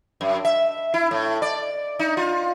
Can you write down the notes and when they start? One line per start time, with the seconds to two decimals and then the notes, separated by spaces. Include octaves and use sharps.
0.21 F#2
0.45 E5
0.94 E4
1.11 A2
1.42 D5
1.99 D#4
2.17 F4